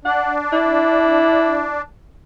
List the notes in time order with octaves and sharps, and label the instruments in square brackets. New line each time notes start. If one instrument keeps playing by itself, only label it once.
[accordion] D4 [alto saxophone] F#5
[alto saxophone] E4